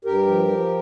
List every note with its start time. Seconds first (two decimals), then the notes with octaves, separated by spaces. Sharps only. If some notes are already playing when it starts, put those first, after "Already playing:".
0.05 G2 G4 A#4
0.27 F3
0.48 F3